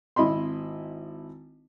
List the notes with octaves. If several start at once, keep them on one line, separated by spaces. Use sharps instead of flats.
G#1 E4 D#5 B5 C6